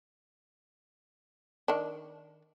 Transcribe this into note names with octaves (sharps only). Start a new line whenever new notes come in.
D#3 D4